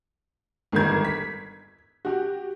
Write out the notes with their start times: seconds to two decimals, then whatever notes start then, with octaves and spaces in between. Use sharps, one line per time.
0.72 G1 G#2 D#3 A#4 G#6
1.05 B6
2.05 F#4 G4